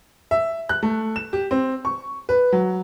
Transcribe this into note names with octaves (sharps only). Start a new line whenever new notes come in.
E5
F#6
A3
E7
G4
C4
C#6
B4
F#3